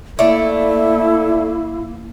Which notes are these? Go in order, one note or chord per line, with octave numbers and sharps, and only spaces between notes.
A3 A#3 E4 A4 D5